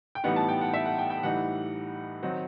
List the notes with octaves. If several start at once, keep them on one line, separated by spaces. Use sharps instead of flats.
G5
A2 E3 G3 B3 D#4 F#5
A5
G5
F#5
E5
F#5
G5
G5
A2 E3 G3 D#4 F#5
D#3 F#3 C4 D#4 F#5